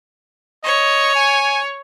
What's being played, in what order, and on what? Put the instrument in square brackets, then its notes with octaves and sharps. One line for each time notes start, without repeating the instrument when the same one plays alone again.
[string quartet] C#5 [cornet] D#5
[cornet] G#5